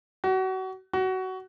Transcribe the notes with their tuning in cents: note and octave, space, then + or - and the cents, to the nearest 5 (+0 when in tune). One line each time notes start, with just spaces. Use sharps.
F#4 +30
F#4 +20